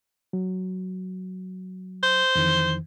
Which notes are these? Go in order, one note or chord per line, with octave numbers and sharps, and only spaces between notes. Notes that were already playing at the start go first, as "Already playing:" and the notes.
F#3
C5
F2 D#3 E3